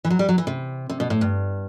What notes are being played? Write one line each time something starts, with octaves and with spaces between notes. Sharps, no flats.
E3
F#3
G3
F#3
E3
C3
C3
B2
A2
G2